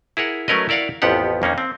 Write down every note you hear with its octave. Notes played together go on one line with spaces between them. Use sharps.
E4 G#4 A#4 F#5
F#3 A3 C#4 A#4 B4 D#5
E4 A#4 D5 F5 F#5
A1 F2 F3 B3 G4 F#5
F2 A#3 C#4 D#4
C4